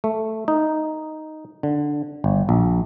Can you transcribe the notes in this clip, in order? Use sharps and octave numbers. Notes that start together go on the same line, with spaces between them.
A3
D#4
D3
G1
A#1